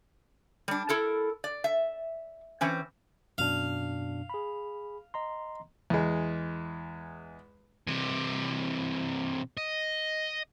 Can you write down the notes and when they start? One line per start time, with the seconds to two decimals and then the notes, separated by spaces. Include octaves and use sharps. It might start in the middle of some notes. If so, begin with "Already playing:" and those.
0.68 G3 D4
0.89 E4 A4 A#4
1.44 D5
1.64 E5
2.61 E3 C4 C#4
3.38 F#2 B2 D4 F5
4.30 G#4 B5
5.14 D#5 A#5 C6
5.90 E2 G#3
7.87 C3 E3
9.57 D#5